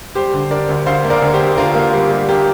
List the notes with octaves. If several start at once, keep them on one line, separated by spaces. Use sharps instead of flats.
G3 G4 C5
D3
D3 A#4 D5
D2
D2 C5 F5
A#3
A#4 D5
D2
G4 C5
A#3
D3 F4 A#4
A#3
G3
G3
A#3 G4